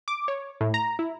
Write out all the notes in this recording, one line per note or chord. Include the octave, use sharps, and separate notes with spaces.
D6
C#5
A2
A#5
E4